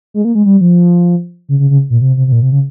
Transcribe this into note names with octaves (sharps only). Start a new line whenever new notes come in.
G#3
A#3
G#3
G3
F3
C#3
C#3
C#3
A#2
C3
C3
C3
A#2
C3
C#3